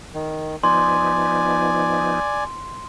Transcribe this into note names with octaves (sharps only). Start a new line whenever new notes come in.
D#3
F3 B3 D#4 D5 G#5 C6